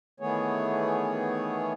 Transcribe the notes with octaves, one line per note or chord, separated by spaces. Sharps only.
D#3 E3 A3 B3 G#4 C#5